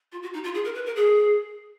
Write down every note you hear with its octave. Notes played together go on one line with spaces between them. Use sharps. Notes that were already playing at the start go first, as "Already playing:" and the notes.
F4
F#4
D#4
F4
G#4
A#4
B4
A#4
G#4